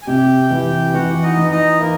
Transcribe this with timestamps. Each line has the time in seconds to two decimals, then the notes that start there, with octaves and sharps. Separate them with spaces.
0.02 G#5
0.07 C3 G4 G5
0.50 E3
0.93 E3 F#4 F#5
1.23 D#4 D#5
1.37 E3
1.51 D#4 D#5
1.80 A#3 E4 A#4